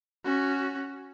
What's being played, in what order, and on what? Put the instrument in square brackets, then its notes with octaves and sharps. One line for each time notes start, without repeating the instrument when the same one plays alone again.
[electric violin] C#4 F#4